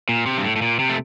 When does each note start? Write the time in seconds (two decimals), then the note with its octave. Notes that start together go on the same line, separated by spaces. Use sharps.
0.09 A#2
0.26 C3
0.38 G2
0.44 A2
0.56 A2
0.62 A#2
0.79 C3
0.89 A3